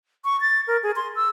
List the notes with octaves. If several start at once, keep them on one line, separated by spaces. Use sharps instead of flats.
C#6
A6
A#4
G#4
C6
E6